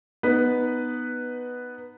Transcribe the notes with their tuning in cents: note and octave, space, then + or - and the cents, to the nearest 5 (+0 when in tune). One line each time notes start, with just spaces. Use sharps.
B3 +0 D#4 -10 B4 +0